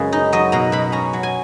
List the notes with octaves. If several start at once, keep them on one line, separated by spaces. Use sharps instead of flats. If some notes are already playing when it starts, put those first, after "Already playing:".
Already playing: F#2 C#3 G#3 G#4 B4
D#4
F#3 D#5
B2 A#5
B2 B5
C#4 A#5
F#3
G#5